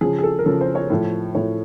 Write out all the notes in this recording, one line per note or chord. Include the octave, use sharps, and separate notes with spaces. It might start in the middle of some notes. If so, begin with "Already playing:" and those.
C#3 F3 G#4
G#4
A4
A#4
C#3 F3 A4
C5
C#5
A2 F3
A2 F3 C#5